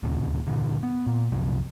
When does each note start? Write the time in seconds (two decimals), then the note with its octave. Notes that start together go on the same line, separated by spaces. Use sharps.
0.03 D1 D#2 A#2 C#3
0.47 G2 A#2 D3 E3
0.83 B3
1.07 A#2
1.32 C2 F#2 C3 F3